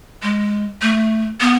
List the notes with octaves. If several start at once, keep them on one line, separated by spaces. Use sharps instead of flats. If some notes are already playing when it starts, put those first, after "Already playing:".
G#3
A3
B3